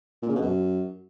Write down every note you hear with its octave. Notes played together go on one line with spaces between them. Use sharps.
A#2
C#3
B2
F#2